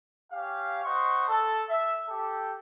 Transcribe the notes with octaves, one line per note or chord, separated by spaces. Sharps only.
C#4 G4 F5
C5 D#5 F#5 C6 C#6
A4
E5
G4 A4